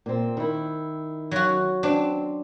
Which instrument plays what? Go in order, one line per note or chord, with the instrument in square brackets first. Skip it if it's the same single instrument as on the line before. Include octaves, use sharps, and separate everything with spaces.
[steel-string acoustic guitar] A#2 C4
D#3 E4
[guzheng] F#3 F#4
[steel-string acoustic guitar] C4 [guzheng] D4